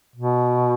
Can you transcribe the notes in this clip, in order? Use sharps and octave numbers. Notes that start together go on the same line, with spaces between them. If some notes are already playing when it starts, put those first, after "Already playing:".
B2